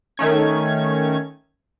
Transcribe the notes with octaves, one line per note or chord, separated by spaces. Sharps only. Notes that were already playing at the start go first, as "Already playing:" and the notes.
D#3 A3 C#4 G#6